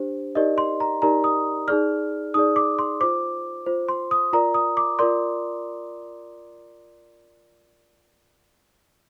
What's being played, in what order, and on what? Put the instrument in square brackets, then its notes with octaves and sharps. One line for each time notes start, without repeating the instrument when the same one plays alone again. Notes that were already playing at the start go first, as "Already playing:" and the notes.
Already playing: [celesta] D4 G4 C5
D#4 G4 A#4 D5 D#5
C6
A#5
D#4 G4 A#4 D5 A#5
D#6
D#4 G#4 D5 F6
D#4 G#4 D5 D#6
D6
C6
F4 C5 D6
F4 C5
C6
D#6
F4 A#4 D5 A#5
D#6
D6
F4 A#4 D5 C6